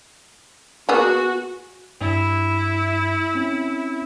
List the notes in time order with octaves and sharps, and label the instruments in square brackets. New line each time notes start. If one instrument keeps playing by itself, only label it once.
[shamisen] A#3 B3 G#4 [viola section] F#4
[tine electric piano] G2 [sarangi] E4
[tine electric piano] C4 C#4